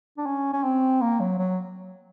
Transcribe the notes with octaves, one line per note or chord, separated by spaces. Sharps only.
D4
C#4
C#4
C4
A#3
F#3
F#3